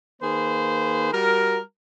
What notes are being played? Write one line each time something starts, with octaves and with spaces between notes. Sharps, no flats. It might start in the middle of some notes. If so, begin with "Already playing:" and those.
D#3 A#3 G#4 B4 C5
G3 F#4 A#4